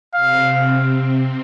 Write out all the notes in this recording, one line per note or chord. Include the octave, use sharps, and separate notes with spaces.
C3 C4 F5